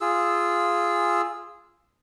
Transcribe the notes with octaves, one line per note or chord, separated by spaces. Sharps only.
F4 G#4 E6